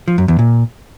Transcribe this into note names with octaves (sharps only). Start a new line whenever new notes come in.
F3
F#2
E2
A#2